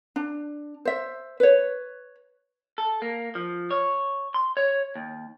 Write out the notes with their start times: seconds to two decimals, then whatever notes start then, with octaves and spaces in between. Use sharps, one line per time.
0.16 D4
0.85 C5 E5
1.40 B4 C#5
2.78 A4
3.02 A#3
3.35 F3
3.71 C#5
4.34 C6
4.57 C#5
4.95 D#2